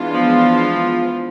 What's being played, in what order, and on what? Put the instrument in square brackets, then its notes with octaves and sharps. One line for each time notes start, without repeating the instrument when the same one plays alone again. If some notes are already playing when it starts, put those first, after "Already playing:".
Already playing: [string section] E3 G#3 B3 D4 F4
[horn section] F3